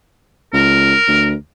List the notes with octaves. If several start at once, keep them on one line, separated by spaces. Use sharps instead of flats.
C#2 A#4
D2